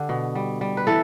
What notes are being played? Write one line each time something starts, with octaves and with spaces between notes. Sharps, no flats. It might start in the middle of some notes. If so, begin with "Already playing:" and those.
Already playing: D3 G4
B2
G3
G3
B4
E3 A4